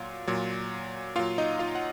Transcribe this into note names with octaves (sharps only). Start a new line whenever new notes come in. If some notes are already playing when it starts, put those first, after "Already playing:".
Already playing: A#2 F#3 F4
A#2 F#3
A#2 F#3 F4 F5
D#4 D#5
F4 F5
F#5